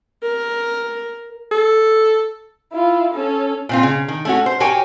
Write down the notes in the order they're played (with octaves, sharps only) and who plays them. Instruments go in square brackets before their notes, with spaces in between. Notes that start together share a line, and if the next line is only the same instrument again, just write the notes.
[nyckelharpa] A#4
[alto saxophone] A4
[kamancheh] E4 F4
C#4 A4
[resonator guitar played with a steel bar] A#2 C4 F4
C#3
D#3
A3 C#4 F#4
C5
F#4 G4 A#4 C#5 G5 G#5